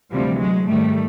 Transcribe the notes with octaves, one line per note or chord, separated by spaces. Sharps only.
D2 C3 E3 F3 G3
F#3 G#3
G#2 D#3 G3 A3